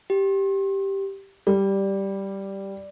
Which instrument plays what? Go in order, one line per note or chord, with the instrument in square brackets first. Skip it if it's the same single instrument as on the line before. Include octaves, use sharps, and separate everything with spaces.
[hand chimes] G4
[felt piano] G3 [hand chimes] D5